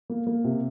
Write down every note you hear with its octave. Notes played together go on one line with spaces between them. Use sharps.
A#3
A#3
C3